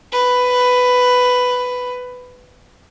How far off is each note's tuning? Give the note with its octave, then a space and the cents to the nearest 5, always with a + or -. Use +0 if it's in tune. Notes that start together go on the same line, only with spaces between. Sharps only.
B4 +10